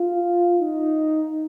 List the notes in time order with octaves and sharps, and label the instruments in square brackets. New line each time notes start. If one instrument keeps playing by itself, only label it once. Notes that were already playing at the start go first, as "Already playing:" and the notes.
Already playing: [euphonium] F4
D#4